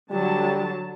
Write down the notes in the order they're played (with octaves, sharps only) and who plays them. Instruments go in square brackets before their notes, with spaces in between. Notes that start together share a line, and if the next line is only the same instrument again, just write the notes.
[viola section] D3 F#3 A5 [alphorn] G3